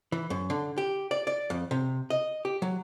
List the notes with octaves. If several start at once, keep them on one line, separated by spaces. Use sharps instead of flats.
E3
F#2
D3
G4
D5
D5
F2
C3
D#5
G4
F#3